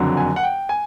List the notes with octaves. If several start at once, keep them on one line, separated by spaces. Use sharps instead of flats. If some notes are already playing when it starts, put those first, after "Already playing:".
Already playing: F#1 F2 D3 F#3
G#5
F#5
G5
G#5